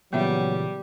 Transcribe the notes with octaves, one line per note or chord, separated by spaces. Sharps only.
A#2 C#3 E3 F#3 G3 B3 E5